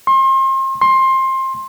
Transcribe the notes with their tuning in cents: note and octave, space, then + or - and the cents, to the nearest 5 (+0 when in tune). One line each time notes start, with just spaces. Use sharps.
C6 +35
C6 +20